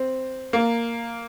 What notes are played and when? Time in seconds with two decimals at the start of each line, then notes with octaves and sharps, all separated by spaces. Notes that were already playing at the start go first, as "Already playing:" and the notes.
Already playing: C4
0.53 A#3